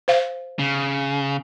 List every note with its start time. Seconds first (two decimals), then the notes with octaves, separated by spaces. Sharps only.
0.08 C5 F5
0.59 C#3